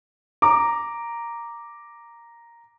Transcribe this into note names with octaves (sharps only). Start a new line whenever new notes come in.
A#5 D6